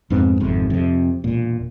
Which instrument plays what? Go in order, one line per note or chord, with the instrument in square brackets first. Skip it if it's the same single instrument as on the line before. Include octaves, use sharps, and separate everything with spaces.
[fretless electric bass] F2 G#2 B3 C4
G#1 F2 C3
F2 C3
E1 A#2